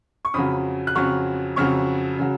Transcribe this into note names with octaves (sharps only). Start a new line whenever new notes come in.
C#6
F2 C#3 F#3 B5 D#6
F#6
F2 C#3 F#3 C#6 F6
F2 C#3 F#3 C#6 F6
C#3 F#3